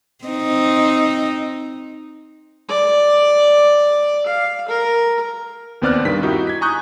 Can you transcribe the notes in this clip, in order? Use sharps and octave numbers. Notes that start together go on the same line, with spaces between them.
C4 D#4
D5
F5
A#4
D#2 B3 C4 D5 F6 F#6
G2 D#3 B6
D#4 E4 F#4 G4
G#6 B6
G#5 A#5 C#6 D#6 F#6 G6